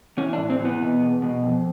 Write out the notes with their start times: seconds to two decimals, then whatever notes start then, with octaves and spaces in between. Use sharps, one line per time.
0.17 E3 C#4
0.33 D4
0.38 A2
0.50 C4
0.60 E3 B3
0.81 B2
1.01 E2
1.22 B2
1.43 F2